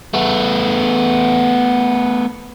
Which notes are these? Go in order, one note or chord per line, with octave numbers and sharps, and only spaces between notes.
A3 B3